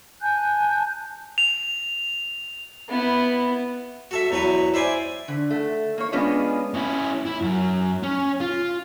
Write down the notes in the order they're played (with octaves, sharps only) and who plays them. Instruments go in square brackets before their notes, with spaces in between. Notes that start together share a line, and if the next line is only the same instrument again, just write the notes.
[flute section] G#5 A5 F#6 G6
[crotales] F7
[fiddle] B3 E4
[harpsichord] F#4 A4 E5
E2 F#3 F#4 B4
E4 C5 D5 G#5
[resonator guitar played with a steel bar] D3
A3
A#3 C#5
G#3 B3 C#4 D4 F4 D#5
[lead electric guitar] C#4 E4
E4
F#2 F#3
C#4
F4